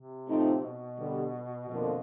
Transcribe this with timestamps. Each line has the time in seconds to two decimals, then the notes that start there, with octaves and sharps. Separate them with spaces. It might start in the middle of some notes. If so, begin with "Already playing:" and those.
Already playing: C3
0.29 A2 F3 A3 C4 D#4
0.63 B2
0.98 D3 G3 B3
1.68 F2 B2 D3 F3 A#3